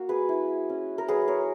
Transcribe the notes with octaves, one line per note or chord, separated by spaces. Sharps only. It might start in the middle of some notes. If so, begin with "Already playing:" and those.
Already playing: A#3 F#4
G#4 B4
E4
C#4
A#4
F#3 G#4 B4
A#4 C#5